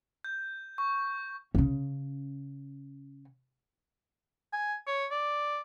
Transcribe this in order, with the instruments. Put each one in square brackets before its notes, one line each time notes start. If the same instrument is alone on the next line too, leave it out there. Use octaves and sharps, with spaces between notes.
[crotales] G6
C#6
[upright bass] C#3 C#4
[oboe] G#5
C#5
D5